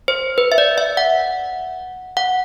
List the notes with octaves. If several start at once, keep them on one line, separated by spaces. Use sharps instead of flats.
C5
B4
E5
D5
E5
F#5
F#5